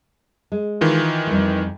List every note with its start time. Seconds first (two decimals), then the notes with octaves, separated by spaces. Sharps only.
0.52 G#3
0.81 D#3 E3 F4
1.27 F2 G3 A3